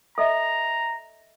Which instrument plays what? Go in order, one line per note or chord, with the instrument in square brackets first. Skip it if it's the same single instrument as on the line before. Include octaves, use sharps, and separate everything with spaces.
[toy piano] A4 D#5 E5 [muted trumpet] A#5